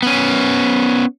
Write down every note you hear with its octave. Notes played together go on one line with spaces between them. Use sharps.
B3 C#4